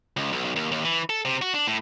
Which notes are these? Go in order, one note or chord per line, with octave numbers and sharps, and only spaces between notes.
C#2
B1
B1
D#2
D#2
E3
A4
C3
F#4
D4
A2